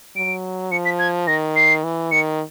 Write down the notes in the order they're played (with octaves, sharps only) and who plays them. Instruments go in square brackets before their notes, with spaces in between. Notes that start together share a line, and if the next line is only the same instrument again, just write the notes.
[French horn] F#3 [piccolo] D7
[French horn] F3 [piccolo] C#7
[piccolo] B6
G#6
[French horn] D#3 [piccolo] A#6
[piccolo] C7
[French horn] E3
[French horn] D#3 [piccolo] C#7